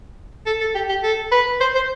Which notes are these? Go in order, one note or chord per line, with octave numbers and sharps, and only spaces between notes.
A4
A4
G4
G4
A4
B4
C5
C5